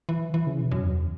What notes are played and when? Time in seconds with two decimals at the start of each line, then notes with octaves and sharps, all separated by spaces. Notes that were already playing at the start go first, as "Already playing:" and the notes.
0.09 E3
0.34 E3
0.47 C#3
0.59 B2
0.71 F#2
0.84 E2